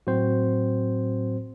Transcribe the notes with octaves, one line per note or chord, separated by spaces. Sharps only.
A2 F#3 C4 F#4 C5